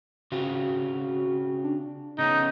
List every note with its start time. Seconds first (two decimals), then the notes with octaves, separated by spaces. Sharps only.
0.32 C#3 C4 F4 F#4
1.64 D4
2.18 C#3 B3 C#4 D#4